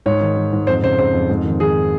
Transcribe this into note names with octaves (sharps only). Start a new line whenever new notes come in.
G#2 C#5
D#3
D#3
G#2
F2 C5
C#3 C5
C#3 C5
F2
G#2
D#3
D#3 G#4